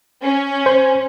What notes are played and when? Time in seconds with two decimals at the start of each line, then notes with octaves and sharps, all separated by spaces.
0.23 C#4
0.66 C5